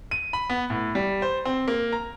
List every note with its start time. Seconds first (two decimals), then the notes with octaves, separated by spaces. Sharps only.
0.11 D#7
0.33 B5
0.50 B3
0.70 A2
0.95 G3
1.22 C5
1.45 C4
1.68 A#3
1.93 A#5